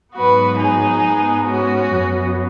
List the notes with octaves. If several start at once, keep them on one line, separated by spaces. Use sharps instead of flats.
G#2 F#3 B3 F#4 B4
D#4 G#4
G#2 G#3 B3
C#4 F#4
F#2 F#3 B3